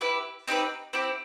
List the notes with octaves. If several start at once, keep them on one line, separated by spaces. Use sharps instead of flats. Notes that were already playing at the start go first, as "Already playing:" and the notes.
E4 G4 B4
C4 D#4 G4 B4
C4 E4 G4